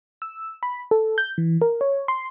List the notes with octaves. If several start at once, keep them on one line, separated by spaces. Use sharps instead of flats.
E6
B5
A4
G6
E3
A#4
C#5
C6